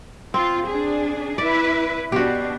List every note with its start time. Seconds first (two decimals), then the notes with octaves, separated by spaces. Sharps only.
0.34 C4 F4
0.67 D4 G#4
1.38 E4 B4 D5
2.12 B2 D4 F#4 G4